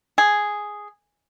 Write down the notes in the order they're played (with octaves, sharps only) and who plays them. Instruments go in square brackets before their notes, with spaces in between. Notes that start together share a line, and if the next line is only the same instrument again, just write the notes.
[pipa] G#4